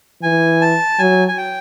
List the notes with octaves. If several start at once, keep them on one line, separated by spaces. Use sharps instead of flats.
E3 G#5
A5
F#3 G#5
G#5
G5